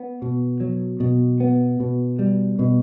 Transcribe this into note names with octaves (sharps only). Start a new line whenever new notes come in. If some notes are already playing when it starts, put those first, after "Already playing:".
Already playing: B3
B2
F#3
B2
B3
B2
G3
B2